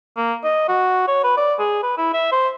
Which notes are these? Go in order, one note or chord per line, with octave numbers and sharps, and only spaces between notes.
A#3
D#5
F#4
C#5
B4
D5
G#4
B4
E4
E5
C5